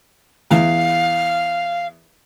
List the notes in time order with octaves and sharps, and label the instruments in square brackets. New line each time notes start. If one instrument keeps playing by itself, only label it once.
[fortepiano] E2 [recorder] F5